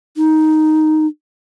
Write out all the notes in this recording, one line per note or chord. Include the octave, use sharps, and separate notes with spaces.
D#4